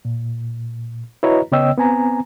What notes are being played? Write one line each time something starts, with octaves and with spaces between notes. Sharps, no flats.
A#2
E4 F#4 B4 C#5 D#5 A#5
C#3 B3 C#5 D#5 G5 E6
B3 C4 G#5 A#5